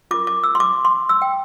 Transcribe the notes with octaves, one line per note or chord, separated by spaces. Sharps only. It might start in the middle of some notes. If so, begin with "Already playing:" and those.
F4 A#4 D6
D6
E6
C6
D6
C6
E6
G5